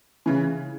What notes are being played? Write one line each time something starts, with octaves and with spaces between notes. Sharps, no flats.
C#3 E3